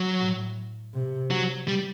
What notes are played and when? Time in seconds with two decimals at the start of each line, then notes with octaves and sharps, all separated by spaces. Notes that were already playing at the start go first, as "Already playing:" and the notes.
Already playing: F#3
0.20 A2
0.94 C3
1.31 F#3
1.68 G3